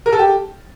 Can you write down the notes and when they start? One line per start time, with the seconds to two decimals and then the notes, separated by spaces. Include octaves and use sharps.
0.06 A#4
0.12 A4
0.19 G4